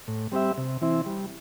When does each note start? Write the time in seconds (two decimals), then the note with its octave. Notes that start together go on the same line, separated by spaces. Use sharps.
0.08 A2
0.32 G3 C4 G4 E5
0.58 C3
0.82 E3 C4 E4
1.06 G3